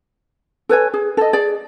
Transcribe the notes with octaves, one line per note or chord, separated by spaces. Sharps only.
A4 B4 C#5 G#5
G#4
A4 D#5
G#4 D5